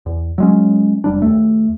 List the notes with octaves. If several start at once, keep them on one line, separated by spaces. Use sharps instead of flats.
E2
F#3 G#3 C#4
F1 G3 D4
D#2 A3